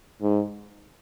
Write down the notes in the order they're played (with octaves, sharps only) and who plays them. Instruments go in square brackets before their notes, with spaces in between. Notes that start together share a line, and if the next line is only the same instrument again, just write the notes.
[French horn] G#2